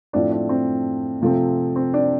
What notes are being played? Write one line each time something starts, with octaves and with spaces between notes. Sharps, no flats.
A2 F3 C4 D4
D4
C4
C3 F3 A3 C4
C4
D4